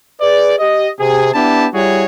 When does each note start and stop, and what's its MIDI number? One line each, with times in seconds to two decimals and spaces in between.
0.20 0.54 68
0.20 0.54 71
0.20 0.54 74
0.59 0.89 67
0.59 0.89 75
0.99 1.32 48
0.99 1.32 68
1.33 1.66 59
1.33 1.66 62
1.33 1.66 64
1.33 1.66 67
1.33 1.66 81
1.73 2.04 55
1.73 2.04 64
1.73 2.04 66
1.73 2.04 68
1.73 2.04 73